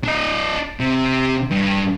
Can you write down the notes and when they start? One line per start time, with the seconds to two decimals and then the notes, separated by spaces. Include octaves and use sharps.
0.04 D4 D#5
0.80 C3
1.51 G2